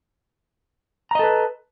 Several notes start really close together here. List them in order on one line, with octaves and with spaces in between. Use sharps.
A#5 D#5 A4 B4